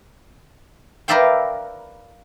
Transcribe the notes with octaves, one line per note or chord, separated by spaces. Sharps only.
A#4 B4 D5 E5 F5 G5